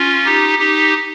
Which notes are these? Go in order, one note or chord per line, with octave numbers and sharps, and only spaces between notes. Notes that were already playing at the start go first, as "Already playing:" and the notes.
Already playing: C#4 F4
D#4 G4
D#4 G4